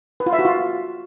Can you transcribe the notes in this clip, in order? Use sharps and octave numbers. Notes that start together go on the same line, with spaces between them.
B4
F4
E5
F#4
F4